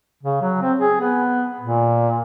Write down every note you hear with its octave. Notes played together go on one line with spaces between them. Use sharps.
C#3
F#3
C4
G#4
B3
A#2